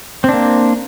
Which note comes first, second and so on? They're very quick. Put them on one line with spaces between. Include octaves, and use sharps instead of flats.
C4 D4 A#3